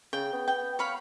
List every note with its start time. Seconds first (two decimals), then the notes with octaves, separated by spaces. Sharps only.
0.13 C#3 G5
0.33 B3
0.48 G5
0.79 C#5 F5 B5